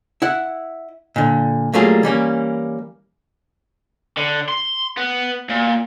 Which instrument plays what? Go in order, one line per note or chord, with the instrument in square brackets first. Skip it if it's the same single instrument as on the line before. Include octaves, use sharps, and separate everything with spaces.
[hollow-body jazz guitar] E4 F#5
A#2 D3
F#3 G3 A3 A#3 F4 G#4
E3 G3 A#3 C#4
[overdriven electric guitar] D3
C6
B3
A#2